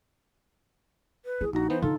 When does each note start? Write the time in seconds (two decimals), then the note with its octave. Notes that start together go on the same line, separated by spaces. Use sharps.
1.25 B4
1.41 E4 G#4
1.53 A#1 D#4 F#4 A#5
1.70 E3 B3 C5
1.82 D3 D#4 F4 A4